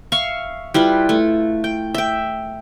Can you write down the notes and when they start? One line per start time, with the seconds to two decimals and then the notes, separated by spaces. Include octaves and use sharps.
0.12 E5 F5 C#6
0.74 G3 E4 F4 B4
1.09 A3
1.64 G5
1.94 E5 G5